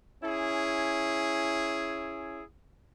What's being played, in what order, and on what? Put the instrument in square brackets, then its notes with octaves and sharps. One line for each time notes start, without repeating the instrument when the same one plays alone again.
[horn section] C#4 E4 G#4